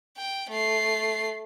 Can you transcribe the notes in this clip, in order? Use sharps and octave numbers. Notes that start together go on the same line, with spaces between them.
G5
A3 C7